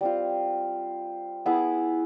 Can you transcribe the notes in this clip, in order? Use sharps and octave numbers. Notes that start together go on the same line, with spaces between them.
G3 C4 F4
B3 E4 G#4